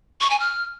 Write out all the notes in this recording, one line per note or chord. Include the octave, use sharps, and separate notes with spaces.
C#6
G#5
F6